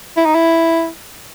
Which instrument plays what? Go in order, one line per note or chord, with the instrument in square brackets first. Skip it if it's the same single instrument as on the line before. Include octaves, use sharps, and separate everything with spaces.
[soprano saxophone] E4
D#4
E4